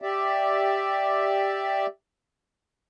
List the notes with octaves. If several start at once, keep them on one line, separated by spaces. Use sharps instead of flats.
G4 D5 E5